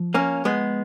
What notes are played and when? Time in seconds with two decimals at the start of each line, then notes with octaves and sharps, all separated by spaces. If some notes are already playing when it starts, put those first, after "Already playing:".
Already playing: F3
0.14 A#3 C#4
0.45 G#3 B3